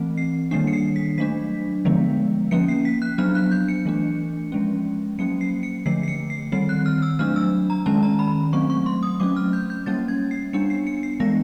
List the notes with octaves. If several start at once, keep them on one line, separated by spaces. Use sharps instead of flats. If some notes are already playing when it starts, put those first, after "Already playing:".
Already playing: E3 A3 C4
C7
D#3 G3 A#3 D4 C7
C#7
C7
B6
F#3 A3 D4 B6
D3 F3 G#3 B3
F3 A#3 C#4 C#7
C7
B6
F#6
F#3 B3 D4 F6
F#6
G6
C#7
E3 A3 D4
F3 G#3 C#4
F#3 A#3 C#4 C#7
C7
C#7
D3 F3 A3 C7
C7
C#7
C7
D#3 G3 C4 C7
F#6
F6
E6
F#3 A3 D4 F6
E6
A#5
D#3 G#3 C#4 A5
A#5
B5
F#3 A3 C4 C#6
C#6
C6
D#6
F#3 A3 C#4 D6
F6
G6
G6
G3 A#3 C#4 A6
G#6
C7
G3 B3 D4 C#7
C7
C#7
C7
E3 G#3 B3 D4 A#6